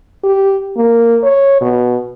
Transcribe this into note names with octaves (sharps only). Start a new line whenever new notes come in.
G4
A#3
C#5
B2